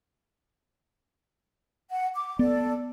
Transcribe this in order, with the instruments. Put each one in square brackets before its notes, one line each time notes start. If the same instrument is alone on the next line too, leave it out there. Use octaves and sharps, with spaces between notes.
[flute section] F#5
D6
[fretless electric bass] B3 [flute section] A4 D5